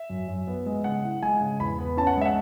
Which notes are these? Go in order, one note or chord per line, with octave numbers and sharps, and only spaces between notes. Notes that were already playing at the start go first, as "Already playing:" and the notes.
Already playing: E5
F#2
F#2
B3
G#3
C#3 F#5
E4
G#3 G#5
C#3
E2 B5
B3
C#4 A5
F#5
G#3 E5
F#5